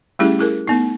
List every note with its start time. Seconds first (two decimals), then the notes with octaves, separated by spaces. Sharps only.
0.19 G3 A3 C#4 E4 G4 G#4
0.39 E4 G#4 A#4
0.68 A3 B3 D#4